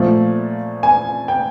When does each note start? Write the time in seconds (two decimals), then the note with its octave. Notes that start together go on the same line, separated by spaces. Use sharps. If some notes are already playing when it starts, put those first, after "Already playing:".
Already playing: A#2 F3 A3
0.83 G#5
1.28 G5